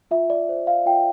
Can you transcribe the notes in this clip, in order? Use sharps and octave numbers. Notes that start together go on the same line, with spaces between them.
F4 E5
D5
C5
F5
F4 G5